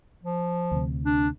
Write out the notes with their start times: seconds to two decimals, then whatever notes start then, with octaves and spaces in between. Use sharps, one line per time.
0.23 F3
0.71 D2 C3
1.05 D4